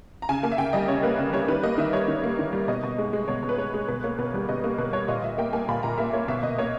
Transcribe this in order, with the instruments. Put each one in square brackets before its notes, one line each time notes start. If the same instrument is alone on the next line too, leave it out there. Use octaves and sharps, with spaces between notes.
[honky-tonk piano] A#5
C#3 G#5
A#3 G#5
E5
C#3 G5
G3 D#5
C#3 C#5
A#3 B4
C#3
G3 C#5
D#3 B4
A#3 D#5
D#3 E5
G3 C#5
D#3
A#3
D#3
G3
B2 D#5
B2
G#3
G#3
B2 C#5
B2
B4
G#3 C#5
G#3
B2 B4
A#3 C#5
B2 B4
G3
B2 D#5
A#3
B2 B4
G3 C#5
A#2 D#5
A#2 E5
A#3 G5
A#3 G#5
A#2 B5
A#2 A#5
A#3 E5
A#3 C#5
B2 E5
E5
B2 D#5
A#3 C#5